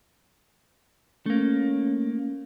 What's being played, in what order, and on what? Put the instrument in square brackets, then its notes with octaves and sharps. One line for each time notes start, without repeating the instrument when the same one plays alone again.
[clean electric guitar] A3 A#3 [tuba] C#4